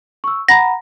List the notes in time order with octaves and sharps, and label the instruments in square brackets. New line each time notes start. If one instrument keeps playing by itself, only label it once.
[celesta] C#6 E6
[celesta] F#5 A#5 B5 [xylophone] A#6